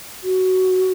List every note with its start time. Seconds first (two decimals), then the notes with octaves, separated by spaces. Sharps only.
0.23 F#4